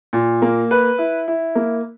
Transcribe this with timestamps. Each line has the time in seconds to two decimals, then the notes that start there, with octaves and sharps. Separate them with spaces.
0.13 A#2
0.42 A#3
0.71 B4
0.98 E4
1.28 E4
1.55 A#3